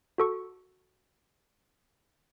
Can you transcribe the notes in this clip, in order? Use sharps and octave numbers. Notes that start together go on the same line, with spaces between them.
F#4 A4 C#6